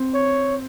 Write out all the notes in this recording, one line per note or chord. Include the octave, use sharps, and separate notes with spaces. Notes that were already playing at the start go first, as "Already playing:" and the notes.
Already playing: C4
C#5